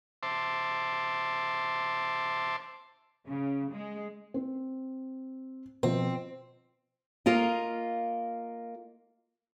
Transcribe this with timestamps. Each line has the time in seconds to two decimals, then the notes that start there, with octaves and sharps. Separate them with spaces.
0.23 C5 E5 A5 C6 D6
3.27 C#3
3.72 G#3
4.34 C4
5.83 B2 F3 C4
7.26 A#3 F4 A#4 D#5